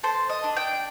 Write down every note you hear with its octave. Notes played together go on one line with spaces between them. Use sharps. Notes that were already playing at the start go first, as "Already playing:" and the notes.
A4 C5
D#5
D4
G5